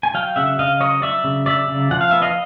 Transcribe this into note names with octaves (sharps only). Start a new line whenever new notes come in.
G#5
F#3 F5 G5
C#3 E5 F#5
C#3 D#5 F5
F#3 C#5 D#5
F#3 D5 E5
C#3
F#3 D5 E5
C#3
F3 F#5
F5
B3 E5
D#5 F5